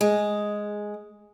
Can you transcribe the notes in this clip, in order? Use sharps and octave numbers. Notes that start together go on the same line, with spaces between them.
G#3